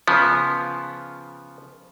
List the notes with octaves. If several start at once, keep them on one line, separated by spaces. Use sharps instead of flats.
C#3 F3 B3